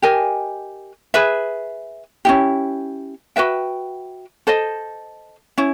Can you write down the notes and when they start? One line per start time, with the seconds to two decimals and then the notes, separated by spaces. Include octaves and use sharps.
0.02 G4 A#4 D#5 G#5
1.14 G#4 B4 E5
2.25 C#4 E4 G4
3.36 F#4 B4 E5 G5
4.47 A4 C5 D#5
5.58 C#4 E4